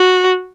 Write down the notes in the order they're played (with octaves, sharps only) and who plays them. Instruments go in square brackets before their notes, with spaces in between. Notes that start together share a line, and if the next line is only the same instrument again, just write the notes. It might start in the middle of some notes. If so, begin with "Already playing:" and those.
Already playing: [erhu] F#4